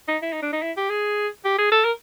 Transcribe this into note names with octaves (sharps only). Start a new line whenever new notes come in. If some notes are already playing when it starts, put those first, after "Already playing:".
D#4
E4
D#4
D4
D#4
E4
G4
G#4
G4
G#4
A4
A#4